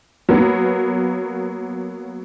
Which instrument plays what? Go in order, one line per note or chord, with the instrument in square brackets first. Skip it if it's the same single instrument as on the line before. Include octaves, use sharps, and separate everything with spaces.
[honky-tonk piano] F#3 A#3 B3